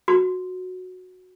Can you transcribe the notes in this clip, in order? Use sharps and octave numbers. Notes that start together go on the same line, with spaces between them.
F#4